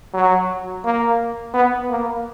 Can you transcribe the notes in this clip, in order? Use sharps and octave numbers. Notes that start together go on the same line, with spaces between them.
F#3
A#3
B3
A#3